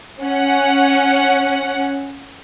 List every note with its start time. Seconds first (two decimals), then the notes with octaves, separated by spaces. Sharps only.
0.23 C#4 F#5